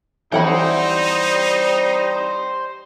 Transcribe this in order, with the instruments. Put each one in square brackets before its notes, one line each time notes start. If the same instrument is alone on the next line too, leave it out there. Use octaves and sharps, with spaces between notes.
[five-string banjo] E3 F#5 B5 [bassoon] G3 [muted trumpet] D#4 [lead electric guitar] C5 G5